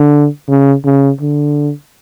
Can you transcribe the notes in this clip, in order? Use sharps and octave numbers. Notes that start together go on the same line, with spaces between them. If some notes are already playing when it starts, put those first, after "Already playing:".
Already playing: D3
C#3
C#3
D3